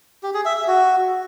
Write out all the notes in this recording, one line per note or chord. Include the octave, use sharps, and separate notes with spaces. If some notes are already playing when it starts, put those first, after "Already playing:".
G4
G#4
E5
E5
F#4